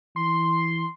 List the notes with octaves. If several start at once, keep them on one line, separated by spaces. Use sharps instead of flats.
E3 C6